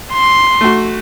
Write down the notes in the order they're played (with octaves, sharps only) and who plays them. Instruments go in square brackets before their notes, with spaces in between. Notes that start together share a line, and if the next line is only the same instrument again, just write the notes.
[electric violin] C6
[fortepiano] A3 F#4